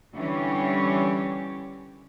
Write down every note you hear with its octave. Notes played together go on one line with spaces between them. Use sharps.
D3 E3 G3 C#4 G4 C#5